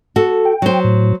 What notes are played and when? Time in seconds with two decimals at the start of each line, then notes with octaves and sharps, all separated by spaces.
0.16 F#4 A4
0.45 G5
0.62 F#3 C5
0.84 A2